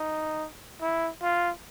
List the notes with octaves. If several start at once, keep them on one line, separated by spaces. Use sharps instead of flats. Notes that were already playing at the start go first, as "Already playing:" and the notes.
Already playing: D#4
E4
F4